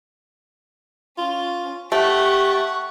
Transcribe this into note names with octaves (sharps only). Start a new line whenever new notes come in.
C#4 F4
A3 G4 F#5 C#6